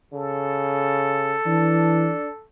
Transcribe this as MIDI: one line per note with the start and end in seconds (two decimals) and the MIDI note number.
0.14 1.36 49
0.14 2.45 69
1.46 2.12 52
1.46 2.28 62